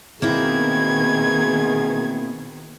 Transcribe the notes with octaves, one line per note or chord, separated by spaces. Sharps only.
B2 D#3 A#3 C4 E4 G#4 G#6